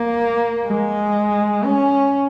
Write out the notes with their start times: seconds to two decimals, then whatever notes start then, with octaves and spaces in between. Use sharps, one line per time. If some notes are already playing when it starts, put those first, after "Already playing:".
Already playing: A#3
0.67 G#3
1.65 C#4